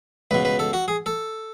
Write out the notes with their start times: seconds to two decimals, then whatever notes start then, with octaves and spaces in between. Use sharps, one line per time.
0.31 C#2 B2 B4
0.45 B4
0.59 A4
0.73 F#4
0.88 G#4
1.06 A4